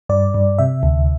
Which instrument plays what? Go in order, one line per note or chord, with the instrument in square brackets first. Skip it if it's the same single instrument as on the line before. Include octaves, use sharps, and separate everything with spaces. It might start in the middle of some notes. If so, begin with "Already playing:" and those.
[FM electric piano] G2 D5
G2
C3 E5
D2